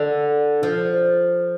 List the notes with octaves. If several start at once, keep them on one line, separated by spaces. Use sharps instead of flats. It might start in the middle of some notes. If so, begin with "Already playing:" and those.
Already playing: D3
F3